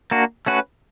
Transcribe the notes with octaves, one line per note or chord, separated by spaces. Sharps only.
A#3 D4 F#4
A3 C#4 F#4 B4